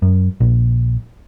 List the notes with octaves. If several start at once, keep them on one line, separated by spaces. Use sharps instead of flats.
F#2
A#1